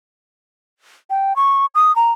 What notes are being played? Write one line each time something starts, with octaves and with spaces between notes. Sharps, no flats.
G5
C#6
D#6
A#5